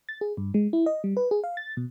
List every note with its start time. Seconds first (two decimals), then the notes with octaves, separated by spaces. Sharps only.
0.09 A6
0.21 G#4
0.37 G2
0.54 G#3
0.73 E4
0.86 D#5
1.04 G3
1.17 B4
1.31 G#4
1.44 F5
1.57 A6
1.77 B2